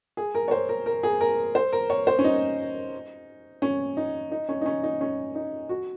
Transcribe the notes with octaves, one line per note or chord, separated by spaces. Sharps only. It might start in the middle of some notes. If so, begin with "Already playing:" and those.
G#4
A#4
C#5
C5
A#4
A#4
G#4
A#4
C5
A#4
C#5
C5
C#4
D#4
C#4
D#4
D#4
C#4
D#4
C#4
D#4
C#4
D#4
F#4